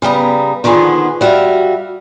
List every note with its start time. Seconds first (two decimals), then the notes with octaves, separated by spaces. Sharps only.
0.02 C#3 G3 B3 A#5
0.64 D3 D#3 F3 B3 G#4
1.21 G3 F#4 E5 F5